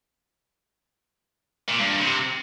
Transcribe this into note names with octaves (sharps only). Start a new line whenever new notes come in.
A#2
G2
G2
C3